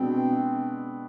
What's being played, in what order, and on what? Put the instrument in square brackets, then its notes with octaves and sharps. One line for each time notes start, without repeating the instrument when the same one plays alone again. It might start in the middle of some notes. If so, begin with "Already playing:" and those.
Already playing: [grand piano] B2 G#3 B3 D4 F#4 [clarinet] C4